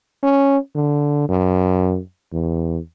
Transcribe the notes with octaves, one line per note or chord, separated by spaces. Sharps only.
C#4
D3
F#2
E2